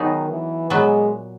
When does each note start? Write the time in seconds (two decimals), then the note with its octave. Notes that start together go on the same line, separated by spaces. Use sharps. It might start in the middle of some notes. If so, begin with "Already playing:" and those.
Already playing: D#3 F#3 B3 D#4 G#4
0.29 E3
0.70 A#2 F#3 G#3 B3